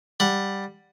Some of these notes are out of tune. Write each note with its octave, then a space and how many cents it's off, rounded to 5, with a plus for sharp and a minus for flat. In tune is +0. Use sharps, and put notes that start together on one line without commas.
G3 +5 F#5 -5